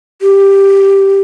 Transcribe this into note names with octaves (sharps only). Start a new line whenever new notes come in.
G4